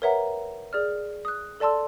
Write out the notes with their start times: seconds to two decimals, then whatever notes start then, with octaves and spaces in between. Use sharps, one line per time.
0.02 A#4 B4 C#5 E5 F#5 A#5
0.73 G#4 D5 F6
1.25 D#6 F#6
1.60 A4 D5 A5 C6 E6